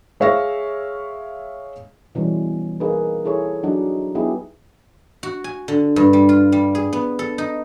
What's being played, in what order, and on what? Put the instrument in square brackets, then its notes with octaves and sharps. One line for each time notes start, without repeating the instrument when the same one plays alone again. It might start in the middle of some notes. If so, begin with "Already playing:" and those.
[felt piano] G#3 C#5 E5 F5 C#6 A#6
[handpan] B2 E3 F3 G3 G#3 C#4
A#3 D#4 G#4 A#4 B4
E4 G#4 A4 C#5
F#3 D4 D#4 F#5
F#3 B3 D#4 E4 G4 G#4
[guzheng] F#4
G#5
D3
G2
G3
F4
G3
G#4
B3
A4
D#4